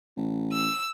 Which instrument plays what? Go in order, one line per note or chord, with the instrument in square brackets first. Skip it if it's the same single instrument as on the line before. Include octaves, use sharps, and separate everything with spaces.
[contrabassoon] A1
[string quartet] E6